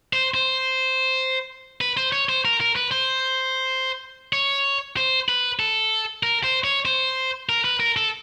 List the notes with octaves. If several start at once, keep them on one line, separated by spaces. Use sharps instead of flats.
C5
C5
B4
C5
C#5
C5
A#4
A#4
B4
C5
C#5
C5
B4
A4
A#4
C5
C#5
C5
A#4
B4
A#4
A4